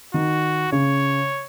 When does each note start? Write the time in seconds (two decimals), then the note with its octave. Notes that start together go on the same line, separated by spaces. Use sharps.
0.14 D#3 F#4
0.72 C#3 C#5